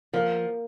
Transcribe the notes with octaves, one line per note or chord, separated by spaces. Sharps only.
F3 A#3